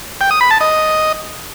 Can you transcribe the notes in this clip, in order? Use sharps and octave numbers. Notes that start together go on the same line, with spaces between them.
G5
D#6
B5
A5
D#5